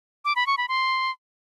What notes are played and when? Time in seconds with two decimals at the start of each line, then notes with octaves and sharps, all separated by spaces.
0.25 D6
0.36 B5
0.47 C#6
0.57 B5
0.68 C6